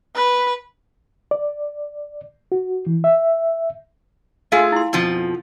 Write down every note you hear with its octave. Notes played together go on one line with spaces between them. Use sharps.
B4
D5
F#4
E3
E5
A3 F4 G#4 F5 F#5 G#5
E4 C6
F2 B2 F3